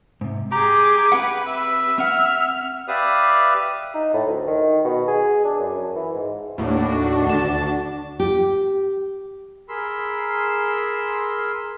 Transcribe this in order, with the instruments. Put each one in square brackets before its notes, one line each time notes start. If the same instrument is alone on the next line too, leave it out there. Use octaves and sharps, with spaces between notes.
[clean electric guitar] G#2 C3
[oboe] G4 [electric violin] G#4 D6 [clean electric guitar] A#5
[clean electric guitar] C4 G4 F#5 [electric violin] B4
[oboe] E5
[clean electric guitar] C4 F#5 [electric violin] F6
[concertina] G4 B4 D5 E5 F5 D#6
[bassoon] D#4
A2
D2
D#3
B2
G#4
D4
F#2
E3
G#2
[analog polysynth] D#2 A2 [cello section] D4 F#4
[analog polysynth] D2 A5
[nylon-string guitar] G4
[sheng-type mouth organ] G#4 A#4 B5 C6 E6